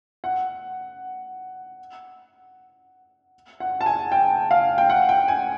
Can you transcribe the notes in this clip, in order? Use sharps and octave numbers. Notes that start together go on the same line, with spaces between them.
F#5
F#5
A5
G#5
G5
F5
G5
F#5
G5
G#5